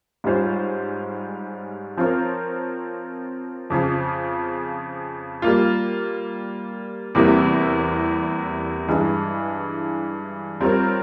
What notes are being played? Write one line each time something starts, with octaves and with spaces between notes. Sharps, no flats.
G#2 G3 C#4 F4 C5
F3 C4 F4 A#4 C#5
F2 C#3 F3
G3 A#3 F4
E2 C3 G3 A#3 E4
G2 E3 G#3
G3 C4 F4 A#4 C#5